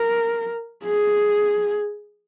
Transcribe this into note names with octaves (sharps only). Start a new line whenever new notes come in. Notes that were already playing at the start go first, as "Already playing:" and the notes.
Already playing: A#4
G#4